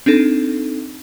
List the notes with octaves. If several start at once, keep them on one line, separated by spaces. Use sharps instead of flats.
C4 D4 D#4 A4